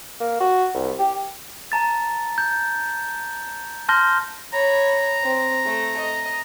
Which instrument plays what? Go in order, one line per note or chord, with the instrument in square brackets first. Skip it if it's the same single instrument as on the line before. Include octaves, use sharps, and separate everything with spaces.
[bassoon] A#3
F#4
C2
G4
[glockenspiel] A5 A#5 A6
G6
A5 C6 F6 G6 A#6 G7
[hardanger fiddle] C#5 B5 [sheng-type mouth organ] A#5
[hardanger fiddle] C4
A3
D#5